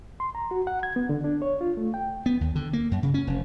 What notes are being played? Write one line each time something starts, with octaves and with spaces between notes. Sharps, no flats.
C6
A#5
F#4
F#5
G#6
B3
D3
D4
C#5
F4
A3
G5
B3
D#2
D3
A#3
F#2
C#3
C#4
F1